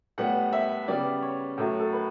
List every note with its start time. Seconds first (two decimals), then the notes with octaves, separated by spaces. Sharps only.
0.18 A2 G3 B3 F#5
0.53 E5
0.88 C#3 G3 B3 D5
1.22 C#5
1.58 A2 F#3 A3
1.79 A4
1.93 B4